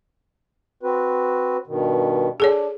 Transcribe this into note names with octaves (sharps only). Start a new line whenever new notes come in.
C4 F#4 B4
G2 B2 D#3
D4 G#4 A4 C#5